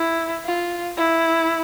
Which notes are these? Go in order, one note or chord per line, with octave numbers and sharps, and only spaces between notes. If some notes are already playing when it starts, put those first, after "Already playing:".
Already playing: E4
F4
E4